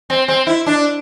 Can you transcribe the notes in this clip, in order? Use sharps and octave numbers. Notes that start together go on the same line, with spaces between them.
C4
C4
E4
D4